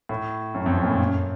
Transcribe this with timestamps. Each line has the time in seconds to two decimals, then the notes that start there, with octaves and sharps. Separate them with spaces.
0.09 A2
0.54 F#2
0.66 F2
0.78 F#2
0.84 A#2
0.88 A2
0.99 F#2